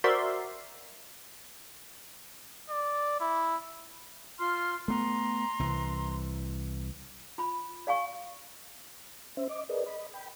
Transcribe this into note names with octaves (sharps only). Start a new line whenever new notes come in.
F#4 A#4 C5 D5 E5 C6
D5
E4
F4 C6 F6
A3 B3 A#5 C6
C2 E3
F4 B5
D5 F5 G#5 C#6
C#4 C5 E5
D#5 D6
G#4 A#4 B4 D5 D#5
D#5 B5
G5 B5